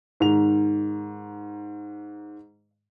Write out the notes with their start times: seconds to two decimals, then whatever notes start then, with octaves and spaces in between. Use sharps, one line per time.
0.20 G#2 D#3 F7